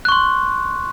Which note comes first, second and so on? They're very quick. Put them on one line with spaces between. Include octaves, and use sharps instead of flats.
F#6 C#6 C6